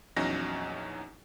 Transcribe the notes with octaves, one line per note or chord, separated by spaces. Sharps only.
A#1 E2 F#3 C#4 D#4 A#6